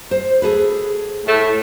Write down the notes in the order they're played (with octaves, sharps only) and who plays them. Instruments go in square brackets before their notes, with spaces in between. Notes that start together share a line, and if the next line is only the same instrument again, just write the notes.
[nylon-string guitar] C5
G#4 A4 B4
[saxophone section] A2 A3